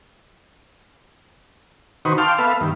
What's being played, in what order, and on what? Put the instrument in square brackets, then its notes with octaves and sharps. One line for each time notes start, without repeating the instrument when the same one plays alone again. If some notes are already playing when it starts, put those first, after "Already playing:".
[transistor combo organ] D#3 D#4 F#4 B4 C5 C#6
F5 G5 A5 C6 D6 F6
B3 A4 B4 E5 F5
G2 D#3